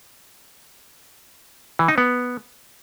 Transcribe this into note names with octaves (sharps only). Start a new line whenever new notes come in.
E3
D#4
B3